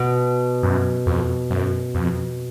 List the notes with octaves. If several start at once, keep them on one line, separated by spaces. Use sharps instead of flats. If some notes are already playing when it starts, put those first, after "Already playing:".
Already playing: B2
F#2
F2
F#2
F2